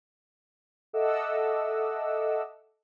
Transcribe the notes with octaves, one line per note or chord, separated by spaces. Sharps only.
A4 D#5 E5 F#5 D6 E6